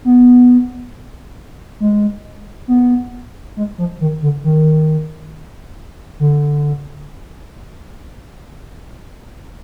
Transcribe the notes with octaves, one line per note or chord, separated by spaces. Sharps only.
B3
G#3
B3
G#3
F3
D#3
D3
D#3
D3